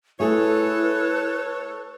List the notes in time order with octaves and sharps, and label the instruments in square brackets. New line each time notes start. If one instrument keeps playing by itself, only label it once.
[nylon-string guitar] A3 G#4 [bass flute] E4 [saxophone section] A4 C#5 [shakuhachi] B4